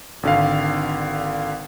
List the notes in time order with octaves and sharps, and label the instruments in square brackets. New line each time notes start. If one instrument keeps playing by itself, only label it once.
[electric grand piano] G#1 D3 F5